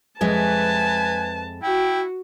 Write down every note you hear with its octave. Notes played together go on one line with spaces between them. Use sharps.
F2 G#3 B4 E5 G#5 A5
E4 F#4 G5